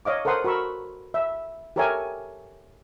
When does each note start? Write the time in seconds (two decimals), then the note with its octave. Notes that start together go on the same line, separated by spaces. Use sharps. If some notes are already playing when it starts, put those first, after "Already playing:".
0.05 C#5 D#5 F5 D6
0.25 A4 A#4 C5 F#5 C6 D#6
0.44 F#4 A#4 B5 C#6 E6
1.14 E5
1.76 G4 A4 A#4 C#5 E5 G#5